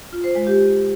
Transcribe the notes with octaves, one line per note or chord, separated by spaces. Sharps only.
F4
C5
G#3
G4